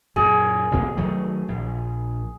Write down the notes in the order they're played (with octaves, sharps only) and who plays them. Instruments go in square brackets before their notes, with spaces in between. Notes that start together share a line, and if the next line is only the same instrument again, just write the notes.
[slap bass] F#2 A#2 [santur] G#4
[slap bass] A1 B2 A#3
D#3 F#3 A3
A#1